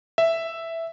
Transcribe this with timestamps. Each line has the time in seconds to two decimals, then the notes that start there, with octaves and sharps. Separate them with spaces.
0.18 E5